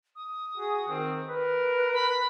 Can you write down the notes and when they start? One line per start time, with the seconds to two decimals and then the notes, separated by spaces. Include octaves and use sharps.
0.16 D#6
0.57 F#4 G#4
0.88 D#3 C4
1.26 A#4 B4
1.93 B5